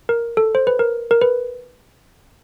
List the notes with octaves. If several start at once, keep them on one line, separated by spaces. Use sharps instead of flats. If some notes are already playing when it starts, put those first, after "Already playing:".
A#4
A4
C5
B4
A#4
A#4
B4